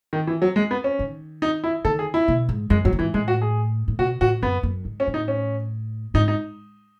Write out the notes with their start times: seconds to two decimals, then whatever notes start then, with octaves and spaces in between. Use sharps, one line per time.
0.13 D#3
0.27 E3
0.42 F#3
0.56 G#3
0.71 B3
0.84 C#4
0.99 D#3
1.42 D#4
1.64 E4
1.85 D#3 A4
1.99 G#4
2.14 E4
2.28 B2
2.49 G#2
2.70 F#2 G#3
2.85 G#2 F#3
2.93 A2
2.99 G#2 E3
3.14 A2 G#3
3.28 F#4
3.42 G#4
3.88 A2
3.99 B2 F#4
4.21 A2 F#4
4.42 F#2 B3
4.63 F#2
4.85 G#2
5.00 C#4
5.07 A2
5.14 D#4
5.28 C#4
6.14 G#2 D#4
6.28 D#4